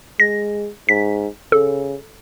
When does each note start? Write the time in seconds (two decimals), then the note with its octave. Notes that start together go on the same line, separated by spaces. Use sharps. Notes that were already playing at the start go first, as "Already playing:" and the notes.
0.20 G#3 A#6
0.89 G#2 B6
1.52 C#3 A4